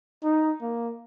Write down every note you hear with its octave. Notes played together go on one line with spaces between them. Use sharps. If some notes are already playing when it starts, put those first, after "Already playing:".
D#4
A#3